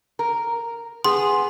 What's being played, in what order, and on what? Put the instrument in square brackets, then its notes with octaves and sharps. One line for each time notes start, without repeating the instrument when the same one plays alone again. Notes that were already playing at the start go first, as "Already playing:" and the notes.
[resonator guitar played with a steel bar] A#4
[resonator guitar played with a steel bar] B3 G#4 [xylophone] C6